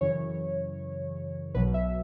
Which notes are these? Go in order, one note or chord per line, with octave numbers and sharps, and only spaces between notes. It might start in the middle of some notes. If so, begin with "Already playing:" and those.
F#2 C#3 E3 C#5
B1 B2 F#3 B4
E5